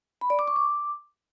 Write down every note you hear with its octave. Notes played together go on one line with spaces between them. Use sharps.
B5
D5
D6
C#6
D6